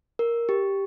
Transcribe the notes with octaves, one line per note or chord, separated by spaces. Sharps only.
A#4
G4